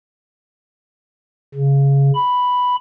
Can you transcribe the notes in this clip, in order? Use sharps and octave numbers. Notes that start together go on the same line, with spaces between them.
C#3
B5